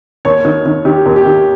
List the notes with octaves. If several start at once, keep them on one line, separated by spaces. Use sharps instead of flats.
D#2 C#5
D#3
D#3
D#3 G4
D#2
G4
D#3